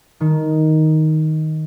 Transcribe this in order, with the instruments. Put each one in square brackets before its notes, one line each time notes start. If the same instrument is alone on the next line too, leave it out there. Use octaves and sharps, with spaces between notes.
[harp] D#3